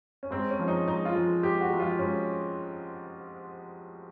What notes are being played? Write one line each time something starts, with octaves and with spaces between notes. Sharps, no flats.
C#4
G#2 C4
C#4
F3 G#3
D#4
G#2 D#4
F4
F3 G#3
G#2 G4
F#4
F3 G#3
F4
G#2 C#4